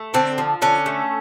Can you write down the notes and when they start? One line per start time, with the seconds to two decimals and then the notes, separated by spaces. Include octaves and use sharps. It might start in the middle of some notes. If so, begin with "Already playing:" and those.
Already playing: A3
0.14 D3 C4
0.38 F3
0.62 D3 C#4
0.86 A3